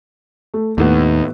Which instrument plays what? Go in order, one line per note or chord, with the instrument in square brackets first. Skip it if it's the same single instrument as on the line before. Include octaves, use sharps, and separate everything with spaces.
[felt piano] A3
[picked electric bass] D#2 [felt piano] A2 B3